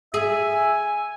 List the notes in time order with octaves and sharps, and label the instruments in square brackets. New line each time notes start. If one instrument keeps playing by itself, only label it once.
[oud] G#4 [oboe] E5 [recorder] G#5